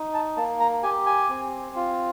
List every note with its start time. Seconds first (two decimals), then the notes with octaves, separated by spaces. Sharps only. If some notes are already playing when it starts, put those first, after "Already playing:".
Already playing: D#4
0.14 A5
0.37 A#3 A5
0.60 A#5
0.83 G4 G#5
1.06 G#5
1.29 C4
1.76 F4